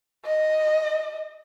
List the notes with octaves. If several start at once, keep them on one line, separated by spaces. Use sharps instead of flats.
D#5